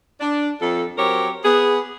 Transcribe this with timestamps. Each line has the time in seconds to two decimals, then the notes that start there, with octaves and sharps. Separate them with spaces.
0.20 D4
0.60 F2 A4
0.97 F#3 C4 G4 A#4 C#5
1.44 B3 G#4